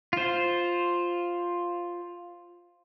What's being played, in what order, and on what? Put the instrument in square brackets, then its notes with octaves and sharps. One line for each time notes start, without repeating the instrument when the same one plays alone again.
[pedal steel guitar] F4 C5